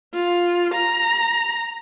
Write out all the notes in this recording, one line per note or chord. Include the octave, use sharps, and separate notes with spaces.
F4
A#5